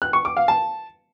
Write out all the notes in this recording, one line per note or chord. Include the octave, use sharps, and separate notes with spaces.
F#6
C#6
D6
F5
A5